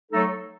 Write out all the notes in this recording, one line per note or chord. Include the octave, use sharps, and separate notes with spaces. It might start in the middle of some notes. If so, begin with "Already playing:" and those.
F#3 A3 D#4 A4